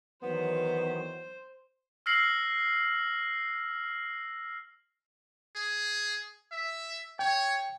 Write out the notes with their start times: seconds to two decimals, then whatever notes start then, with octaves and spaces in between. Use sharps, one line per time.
0.23 E2 D#3 F#3 B3 C5
2.06 E6 F6 A#6 C7 F#7
5.56 G#4
6.52 E5
7.19 C#5 G5